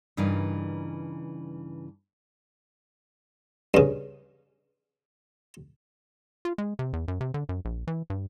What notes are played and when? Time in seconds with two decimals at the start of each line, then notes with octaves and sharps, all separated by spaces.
0.17 G2 C#3 E3 D#4 A#4
3.74 G2 C#3
6.45 F4
6.58 G#3
6.79 C3
6.93 E2
7.08 F#2
7.21 C3
7.34 D3
7.49 F#2
7.65 A#1
7.87 E3
8.10 G2